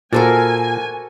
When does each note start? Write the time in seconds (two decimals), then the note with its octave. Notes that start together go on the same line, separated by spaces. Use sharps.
0.13 A#2 F#4 A4 A#4 C5 D5 G#5